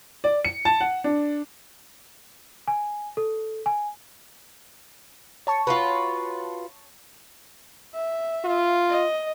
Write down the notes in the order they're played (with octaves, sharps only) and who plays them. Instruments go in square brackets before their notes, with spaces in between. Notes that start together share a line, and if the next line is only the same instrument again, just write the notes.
[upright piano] D5
C#7
A5
F#5
D4
[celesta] G#5
A4
G#5
[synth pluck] C#5 A5 C#6
[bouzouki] F4 F#4 B4
[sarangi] E5
[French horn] F4
[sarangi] D#5